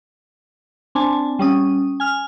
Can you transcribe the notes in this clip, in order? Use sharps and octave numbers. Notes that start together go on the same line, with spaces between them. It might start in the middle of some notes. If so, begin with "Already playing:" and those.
C4 D4 G#5 A5
G3 C#4 D#6
G#5 F6